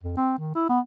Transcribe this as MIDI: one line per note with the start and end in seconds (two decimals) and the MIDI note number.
0.03 0.16 41
0.17 0.36 60
0.38 0.52 51
0.55 0.66 64
0.69 0.80 59